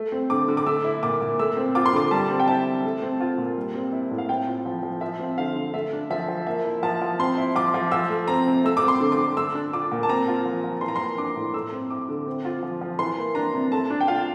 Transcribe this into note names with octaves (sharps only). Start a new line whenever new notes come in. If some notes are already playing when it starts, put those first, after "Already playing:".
Already playing: A3
C4
D3 D6
D3
D6
A3 E6
E4
A#2 D6
A#2
A3 E6
C4
F4 D6
C6
D3 D6
G3 A5
C4
G5
E4 A5
C3
A3
C4
F4
A#2
G3
C4
E4
A2
F5
C4 G5
F4
F3
F3
F3 E5
C4
D3 F5
D3
A3 E5
D4
F3 E5
F3
A#3 E5
E4
F3 A5
F3
C4 C6
E4
F3 D6
F3
F3 E6
A3
C4 A#5
C3
A3 E6
D6
C4
C6
D3
D6
D3
A3 E6
D4
F4 D6
A#2
A5
C4 A#5
F4
F3
F3
E3 C6
A#5
A#3 C6
D4 D6
A2
A3 E6
C4
E4 D6
D3
C4
F4
F3
F3
E3 C6
A#3
D4 A#5
C3
A3 A5
D4
G5
F4 F5